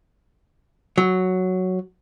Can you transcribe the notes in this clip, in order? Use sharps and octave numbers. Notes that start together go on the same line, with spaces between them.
F#3